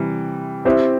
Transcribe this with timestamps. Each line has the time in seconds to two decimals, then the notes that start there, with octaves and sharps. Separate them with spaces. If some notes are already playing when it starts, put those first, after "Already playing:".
Already playing: C3 E3 G3
0.65 C4 E4 G4 C5 E5